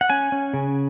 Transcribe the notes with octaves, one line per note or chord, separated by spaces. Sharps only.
F#5
C#4 G#5
C#4
C#3